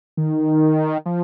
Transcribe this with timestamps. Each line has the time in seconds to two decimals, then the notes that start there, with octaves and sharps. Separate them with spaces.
0.17 D#3
1.06 F3